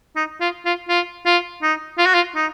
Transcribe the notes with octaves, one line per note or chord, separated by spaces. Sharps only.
D#4
F4
F4
F4
F4
D#4
F4
F#4
F4
D#4